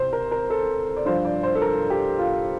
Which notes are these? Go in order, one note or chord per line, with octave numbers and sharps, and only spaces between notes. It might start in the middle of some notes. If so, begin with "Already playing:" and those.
Already playing: C3 C5
A#4
A#4
A4
D5
G2 F3 C5
D5
C5
A4
A#4
G4
F4